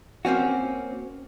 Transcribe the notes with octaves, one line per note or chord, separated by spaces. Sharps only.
A#3 C4 C#4 F#4